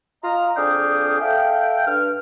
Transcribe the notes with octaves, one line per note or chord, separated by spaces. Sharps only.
F4 D#5 A#5
F2 D4 G#4 F5 G5 D#6
A4 E5 F5 G5
G2 F6